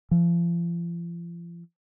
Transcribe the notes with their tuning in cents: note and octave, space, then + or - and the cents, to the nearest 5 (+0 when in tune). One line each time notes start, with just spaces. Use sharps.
F3 -40